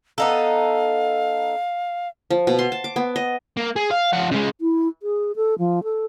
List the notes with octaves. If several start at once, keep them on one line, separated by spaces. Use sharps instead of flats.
B3 D#4 A4 F5
F3
B2
C6
A5
D6
B3
D#5
A#3
G#4
F5
F3 F#5
C#3 G#3
E4
G#4
A4
F3
A4